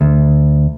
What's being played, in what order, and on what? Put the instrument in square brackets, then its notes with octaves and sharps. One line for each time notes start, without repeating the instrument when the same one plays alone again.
[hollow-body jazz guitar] D2